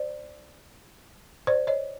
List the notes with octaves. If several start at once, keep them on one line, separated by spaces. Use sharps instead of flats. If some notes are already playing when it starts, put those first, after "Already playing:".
Already playing: C5 D5
C5 D5
C#5 D#5